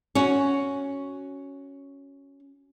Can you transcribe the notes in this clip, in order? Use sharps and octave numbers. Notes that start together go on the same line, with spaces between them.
C#4 F#4